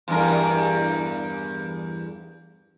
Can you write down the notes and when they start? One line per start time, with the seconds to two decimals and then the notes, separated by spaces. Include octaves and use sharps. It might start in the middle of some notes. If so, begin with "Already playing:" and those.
0.08 E2 G2 A#4